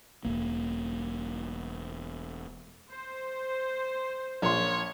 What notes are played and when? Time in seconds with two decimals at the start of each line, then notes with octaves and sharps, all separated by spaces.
0.25 E1 D#2 A#3
2.91 C5
4.42 A#1 C#5 C6